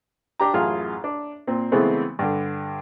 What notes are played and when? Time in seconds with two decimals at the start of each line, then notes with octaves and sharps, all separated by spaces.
0.40 D4 G4 A#5
0.54 A1 F#2 F4 G#4 F6
1.04 D4
1.47 A#2 C4
1.72 C#3 E3 G#3 A3 B3 C4
2.19 G2 D3